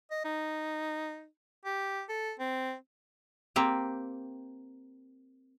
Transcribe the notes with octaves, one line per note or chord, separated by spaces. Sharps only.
D#5
D#4
G4
A4
C4
A#3 C4 G4